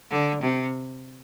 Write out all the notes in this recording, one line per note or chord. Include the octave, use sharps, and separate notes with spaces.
D3
C3